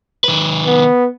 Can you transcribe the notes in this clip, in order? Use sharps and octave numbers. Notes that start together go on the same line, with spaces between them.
D#3 B4
B3